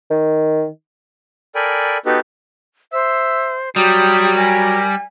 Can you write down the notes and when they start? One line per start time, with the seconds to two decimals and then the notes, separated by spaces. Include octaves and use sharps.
0.11 D#3
1.55 A4 A#4 D5 G5 G#5 B5
2.06 B3 D#4 F#4 G4 A4 B4
2.93 C5 E5
3.76 F#3 G3 G4 D#6
4.37 A#4 G#5